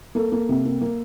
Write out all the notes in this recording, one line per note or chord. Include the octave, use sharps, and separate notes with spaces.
A#3 A4
A#3
C3
A#3
A#3